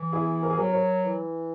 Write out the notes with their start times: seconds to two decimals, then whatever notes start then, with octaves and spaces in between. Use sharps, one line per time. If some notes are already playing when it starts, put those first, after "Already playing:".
Already playing: E3
0.12 B3 E4 G#4
0.43 A#4
0.50 G#4
0.57 F#3 F#4 A#4
0.72 A#4 C#5
1.03 E3